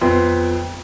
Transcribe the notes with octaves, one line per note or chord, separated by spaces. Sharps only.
F2 B3 C6